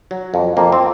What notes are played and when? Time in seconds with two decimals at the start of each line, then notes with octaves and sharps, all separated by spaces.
0.11 F#3
0.34 F2
0.57 F2 A#3
0.72 C4